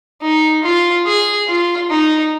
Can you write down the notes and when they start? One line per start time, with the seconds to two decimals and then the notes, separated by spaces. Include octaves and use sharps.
0.22 D#4
0.63 F4
1.06 G#4
1.47 F4
1.90 D#4